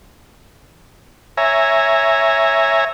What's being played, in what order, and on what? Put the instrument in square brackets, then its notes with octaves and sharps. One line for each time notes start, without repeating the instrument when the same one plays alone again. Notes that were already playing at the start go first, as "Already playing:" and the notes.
[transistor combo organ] C#5 E5 G#5 A#5